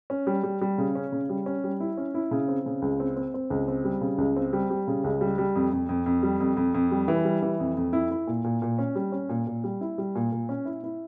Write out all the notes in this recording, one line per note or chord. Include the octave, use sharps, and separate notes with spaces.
C#4
G3
G3
G3
C#3
C#4
C#3
G3
C#4
G3
E4
C#4
E4
C#3
C4
C#3
C#2
C4
C4
C4
C#2
C4
G3
C#3
C#2
C4
G3
G3
C#3
C#2
G3
G3
F2
F2
F2
F2
G3
F2
F2
F2
G3
E3
G3
E3
F2
F2
E4
E4
A#2
A#2
A#2
C#4
G3
C#4
A#2
A#2
G3
E4
G3
A#2
A#2
C#4
E4
E4